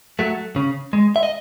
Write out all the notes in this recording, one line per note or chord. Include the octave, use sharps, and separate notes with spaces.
F#3 A3
C#3
G#3
E5
D#5